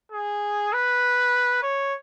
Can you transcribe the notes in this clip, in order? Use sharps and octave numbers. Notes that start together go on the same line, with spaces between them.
G#4
B4
C#5